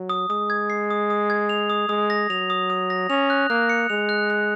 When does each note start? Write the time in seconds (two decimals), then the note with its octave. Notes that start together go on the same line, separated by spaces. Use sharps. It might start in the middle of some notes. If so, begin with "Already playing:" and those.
Already playing: F#3
0.09 D#6
0.30 G#3 D#6
0.50 G#6
0.70 C7
0.90 D#6
1.10 D#6
1.30 G#6
1.49 F7
1.70 D#6
1.89 G#3 D#6
2.10 A#6
2.30 F#3 F7
2.50 D#6
2.70 D#6
2.90 A#6
3.09 C#4 F7
3.30 F#6
3.50 A#3 F#6
3.69 C#7
3.90 G#3 F7
4.09 F#6
4.30 F#6